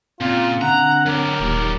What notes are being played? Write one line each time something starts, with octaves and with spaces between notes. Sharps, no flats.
A#2 C#3 C4 F4
D3 F#5 A#5
F#3 G4 A#4
D#1 D#2